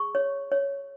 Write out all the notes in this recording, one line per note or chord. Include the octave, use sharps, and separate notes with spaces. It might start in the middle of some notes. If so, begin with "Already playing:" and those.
Already playing: G#4 C#6
C#5
C#5